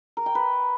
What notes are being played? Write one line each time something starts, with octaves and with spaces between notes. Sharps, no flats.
A#4
G5
B4